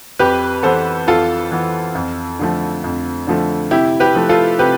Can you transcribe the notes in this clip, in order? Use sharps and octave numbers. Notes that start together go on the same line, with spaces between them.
F2 G4 B4
E3 B3 A4 C5
F2 F4 A4
E3 B3
F2
D3 F3 A3
F2
D3 F3 A3
C3 E4 G4
G4 B4
F3 A3
F4 A4
C3 G4 B4